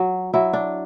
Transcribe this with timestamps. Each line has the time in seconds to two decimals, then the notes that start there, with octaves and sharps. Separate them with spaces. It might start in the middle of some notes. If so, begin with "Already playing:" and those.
Already playing: F#3
0.34 F#3 E4
0.53 D4